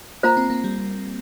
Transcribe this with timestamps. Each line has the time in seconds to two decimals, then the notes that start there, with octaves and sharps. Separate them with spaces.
0.23 A#3 F4 C5 F5 A#5
0.37 C4
0.50 A#3
0.64 G3